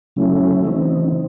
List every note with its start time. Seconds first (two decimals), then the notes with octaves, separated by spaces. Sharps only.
0.16 C#3 F#3 A3 C#4 E4
0.64 C#3 E3 C4 D#4
1.12 C4